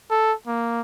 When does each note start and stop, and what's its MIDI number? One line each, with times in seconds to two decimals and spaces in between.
0.10 0.33 69
0.47 0.82 58